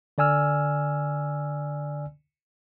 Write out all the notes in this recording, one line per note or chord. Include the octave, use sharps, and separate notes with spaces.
D3 D5 G#5 E6 F6